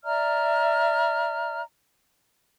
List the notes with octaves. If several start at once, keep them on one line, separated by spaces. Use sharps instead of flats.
D5 E5 A#5 F6